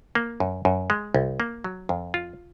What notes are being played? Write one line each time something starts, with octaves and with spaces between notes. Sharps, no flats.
A#3
F#2
F#2
G#3
C2
A#3
F#3
F2
F4